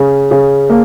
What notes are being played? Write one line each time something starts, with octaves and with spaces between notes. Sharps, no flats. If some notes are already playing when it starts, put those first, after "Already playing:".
Already playing: C#3
C#3
A#3